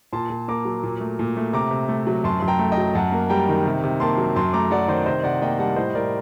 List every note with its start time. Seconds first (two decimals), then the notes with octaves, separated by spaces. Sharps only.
0.13 A#2 A5 C6
0.30 A#2
0.48 A#3 A#5 D6
0.65 F#3
0.83 A#2
1.01 A3
1.19 A#2
1.37 A3
1.53 C3 A#5 D6
1.71 C3
1.89 A3
2.07 F#3
2.24 F#2 A5 C6
2.40 F#2 C6
2.48 G5 A#5
2.59 A3
2.72 D#5 G5
2.78 F#3
2.95 F#2 F#5 A5
3.12 A#3
3.30 G3 G5 A#5
3.48 D#3
3.66 C3
3.84 C3
4.00 A#3 A5 C6
4.18 F#3
4.36 F#2 A5 C6
4.53 A3 A#5 D6
4.71 F#3 D5 F#5
4.88 D#3 C5 D#5
5.06 C3 C5 D#5
5.23 C3 D5 F#5
5.42 A#3 D#5 G5
5.59 G3 F#5 A5
5.76 A2 C5 D#5
5.95 A2 A#4 D5